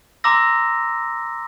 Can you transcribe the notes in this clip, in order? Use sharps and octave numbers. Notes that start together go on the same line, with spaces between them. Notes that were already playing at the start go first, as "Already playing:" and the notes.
A#5 C6 D6 E6 A#6